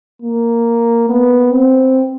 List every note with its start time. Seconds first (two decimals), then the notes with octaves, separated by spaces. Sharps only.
0.22 A#3
1.09 B3
1.52 C4